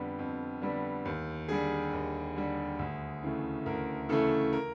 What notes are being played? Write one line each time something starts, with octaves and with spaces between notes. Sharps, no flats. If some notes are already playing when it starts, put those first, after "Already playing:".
Already playing: F2 D3 G3 B3
F2
D3 G3 B3
D#2
D3 G3 G#4
D#2
D3 G3
D2
C#3 E3 A3
D2 A#4
C#3 E3 A3 A4
A#4